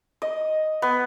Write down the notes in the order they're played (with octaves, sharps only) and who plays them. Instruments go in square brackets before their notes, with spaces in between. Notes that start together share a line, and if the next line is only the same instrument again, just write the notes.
[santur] D#5
B3